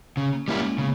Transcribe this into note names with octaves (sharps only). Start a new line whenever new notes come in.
C#3 C#4
A#3
G3 G#3 A#3 E4
A#3
C#3 B3